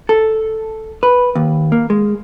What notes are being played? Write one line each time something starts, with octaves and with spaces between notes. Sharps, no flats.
A4
B4
D#2
A#3
G#3